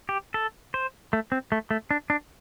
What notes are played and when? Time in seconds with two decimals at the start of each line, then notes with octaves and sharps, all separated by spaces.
0.09 G4
0.34 A4
0.74 C5
1.13 A3
1.32 C4
1.52 A3
1.71 A3
1.91 D4
2.10 D4